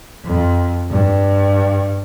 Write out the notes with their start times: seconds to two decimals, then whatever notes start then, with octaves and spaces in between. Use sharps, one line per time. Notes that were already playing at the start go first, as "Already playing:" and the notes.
0.24 F2
0.90 G2